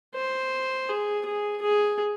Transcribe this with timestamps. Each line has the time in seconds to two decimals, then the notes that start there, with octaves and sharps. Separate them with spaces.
0.15 C5
0.89 G#4
1.25 G#4
1.62 G#4